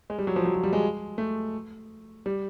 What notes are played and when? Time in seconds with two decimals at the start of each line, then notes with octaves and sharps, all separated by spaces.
0.10 G#3
0.18 G3
0.27 F#3
0.36 F3
0.45 F#3
0.55 F3
0.64 G3
0.73 G#3
1.18 A3
2.26 G3